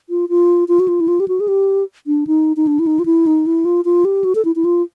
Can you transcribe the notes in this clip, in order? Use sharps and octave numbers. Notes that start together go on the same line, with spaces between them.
F4
F4
F4
F#4
F4
E4
F4
G4
F#4
G#4
G4
D4
D#4
D#4
D4
E4
D#4
F4
E4
D#4
E4
F4
F4
G4
F#4
A4
E4
E4
F4